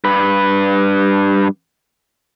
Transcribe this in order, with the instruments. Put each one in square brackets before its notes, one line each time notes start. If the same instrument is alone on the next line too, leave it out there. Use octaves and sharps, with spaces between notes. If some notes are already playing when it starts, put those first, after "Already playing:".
[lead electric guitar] G2 B4